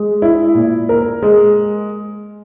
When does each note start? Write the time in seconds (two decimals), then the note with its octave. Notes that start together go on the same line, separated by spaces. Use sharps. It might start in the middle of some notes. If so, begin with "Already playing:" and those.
Already playing: G#3
0.22 E4
0.55 A#2
0.89 A#4
1.22 G#3